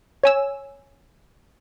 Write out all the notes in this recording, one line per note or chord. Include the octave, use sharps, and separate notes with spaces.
C#5 G#5 E6